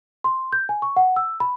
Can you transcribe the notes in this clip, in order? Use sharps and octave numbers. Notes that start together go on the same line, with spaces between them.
C6
G6
G#5
C#6
F#5
E6
B5